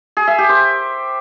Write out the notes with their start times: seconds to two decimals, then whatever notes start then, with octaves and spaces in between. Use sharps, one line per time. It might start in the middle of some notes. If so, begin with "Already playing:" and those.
0.17 G#4
0.27 E5
0.38 G4
0.49 C5